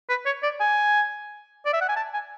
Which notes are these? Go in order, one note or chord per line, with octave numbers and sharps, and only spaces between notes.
B4
C#5
D5
G#5
D5
E5
F#5
G#5
A5
G#5